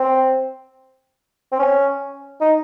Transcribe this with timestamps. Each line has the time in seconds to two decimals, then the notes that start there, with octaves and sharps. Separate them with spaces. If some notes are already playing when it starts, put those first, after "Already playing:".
Already playing: C4
1.52 C4
1.59 C#4
2.41 D#4